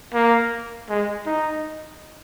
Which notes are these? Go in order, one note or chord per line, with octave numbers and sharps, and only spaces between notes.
A#3
G#3
D#4